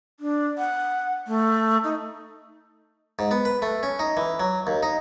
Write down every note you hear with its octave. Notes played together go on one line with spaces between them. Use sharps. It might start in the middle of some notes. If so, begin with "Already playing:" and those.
D4
F#5
A3
D#4
G#2
B3
B4
A3
C#4
D#4
E3
F#3
D#2
D#4